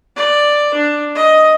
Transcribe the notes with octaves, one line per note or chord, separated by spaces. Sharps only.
D5
D4
D#5